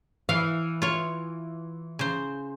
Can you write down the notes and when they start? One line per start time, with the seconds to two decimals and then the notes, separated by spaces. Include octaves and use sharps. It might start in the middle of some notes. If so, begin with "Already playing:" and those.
0.29 E3 F5
0.82 F4 C#5
1.99 C#3 C5